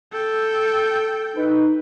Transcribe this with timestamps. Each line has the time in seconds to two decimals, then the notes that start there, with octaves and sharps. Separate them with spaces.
0.12 A4 G5
1.36 D#4 B4